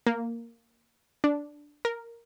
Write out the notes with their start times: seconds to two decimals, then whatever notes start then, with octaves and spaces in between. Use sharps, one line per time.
0.07 A#3
1.24 D4
1.85 A#4